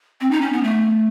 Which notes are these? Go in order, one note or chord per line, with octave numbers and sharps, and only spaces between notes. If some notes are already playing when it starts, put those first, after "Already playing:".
C4
D#4
C#4
B3
A3